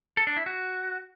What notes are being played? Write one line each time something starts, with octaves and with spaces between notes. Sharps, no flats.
A4
D4
E4
F#4